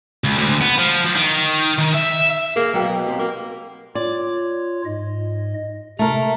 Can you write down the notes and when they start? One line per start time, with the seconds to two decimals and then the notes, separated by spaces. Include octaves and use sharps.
0.24 C#2
0.38 D2
0.61 B3
0.79 F3
1.15 D#3
1.78 D#3
1.94 E5
2.56 A#3 G#4
2.74 B2 F#3 F5 G5
3.07 F#3 C4 G4
3.19 A#3
3.95 F4 C#5 D5
4.85 G#2 D#5
5.99 C3 A3 A#4 A#5